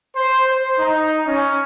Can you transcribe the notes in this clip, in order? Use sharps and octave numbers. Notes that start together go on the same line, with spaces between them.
C5
C5
D#4
C#4